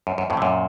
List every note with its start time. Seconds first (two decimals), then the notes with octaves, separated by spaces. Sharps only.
0.07 F#2
0.18 F#2
0.30 F2 A2
0.37 C3
0.42 F#2 A#2